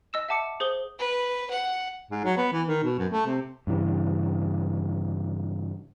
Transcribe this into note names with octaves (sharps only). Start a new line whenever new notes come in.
D#5 E6 E7
E5 F#5 A5 D6 C#7
G#4 C5 D#6 G7
B4
F#5
G#2
F#3
B3
E3
D#3
B2
F#2
A3
C3
G2 C#3 E3